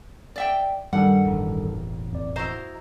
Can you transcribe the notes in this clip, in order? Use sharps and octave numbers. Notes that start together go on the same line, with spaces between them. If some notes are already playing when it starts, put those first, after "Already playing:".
D5 E5 G5
G2 D#3 G3 A4 F#5
E1 A1
F2 D5
E4 F#4 C5 D#5 A#5